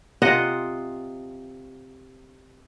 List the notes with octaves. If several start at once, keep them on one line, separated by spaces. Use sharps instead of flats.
C3 F4 D#5 F#5